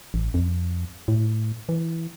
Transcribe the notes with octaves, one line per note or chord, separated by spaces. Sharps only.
A1
F2
A2
E3